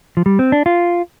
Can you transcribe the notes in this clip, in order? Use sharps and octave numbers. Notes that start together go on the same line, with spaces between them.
F3
G3
C4
D4
F4